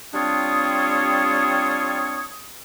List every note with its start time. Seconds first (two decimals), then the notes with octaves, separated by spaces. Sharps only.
0.14 G3 C4 D4 F4 C#5 D#6